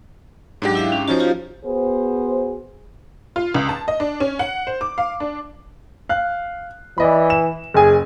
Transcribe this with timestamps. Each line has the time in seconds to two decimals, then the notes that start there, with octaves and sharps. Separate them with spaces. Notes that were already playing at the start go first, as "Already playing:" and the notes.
0.62 G#2 F#3 D4 G4 D5
0.75 E4 E5 F5
0.92 C#4
1.08 F3 C#4 D#4 F#4 C5
1.19 F4 G4 F5
1.64 B3 F#4 G#4 C5
3.36 F4
3.54 C#2
3.69 A5
3.88 D#5
4.00 D4
4.20 C#4
4.39 F#5
4.67 C5
4.81 D6
4.98 F5
5.20 D4
6.09 F5 F#6
6.98 E3 D5 D#5 B5
7.30 E7
7.74 F#1 G#4 G#5